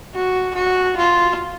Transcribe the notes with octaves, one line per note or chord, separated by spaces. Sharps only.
F#4
F#4
F4